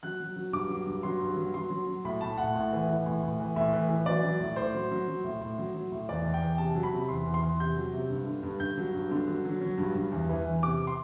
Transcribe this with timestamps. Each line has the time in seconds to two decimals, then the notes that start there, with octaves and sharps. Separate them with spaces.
0.03 F#3 F#6
0.20 F#3
0.36 F#3
0.53 G2 D6
0.69 F#3
0.86 G2
1.03 F#3 C6
1.20 G2
1.37 F#3
1.54 F#3 C6
1.70 F#3
1.87 F#3
2.04 A2 B5
2.21 A2 A5
2.38 A2 F#5
2.55 A2
2.72 E3
2.89 E3
3.06 A2
3.23 A2
3.40 E3
3.56 A2 E5
3.73 E3
3.89 E3
4.06 F#3 D5
4.23 F#3
4.40 A2
4.56 A2 C5
4.74 F#3
4.91 F#3
5.07 F#3
5.24 A2
5.41 A2
5.58 F#3
5.74 F#3
5.92 A2
6.09 E2 D5
6.25 E2
6.34 G5
6.42 E2
6.58 C3 A5
6.75 F#3
6.83 B5
6.93 C3
7.09 E2 C6
7.26 E2
7.34 C6
7.43 E2
7.60 C3 G6
7.77 F#3
7.93 C3
8.10 G2
8.26 D3
8.43 G2
8.60 G2 G6
8.77 F#3
8.94 G2
9.11 D3
9.28 F#3
9.45 F#3
9.61 F#3
9.78 G2
9.95 G2
10.11 E2
10.29 E3
10.46 E2
10.63 C3 D6
10.87 C6